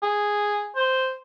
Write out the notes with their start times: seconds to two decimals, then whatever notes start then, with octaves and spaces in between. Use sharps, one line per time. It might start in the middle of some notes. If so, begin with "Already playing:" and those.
0.03 G#4
0.76 C5